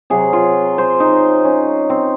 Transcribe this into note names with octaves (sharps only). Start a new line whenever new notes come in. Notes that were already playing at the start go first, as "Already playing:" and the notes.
C3 F#3 G#4
F4
C5
D#4
C#4
C4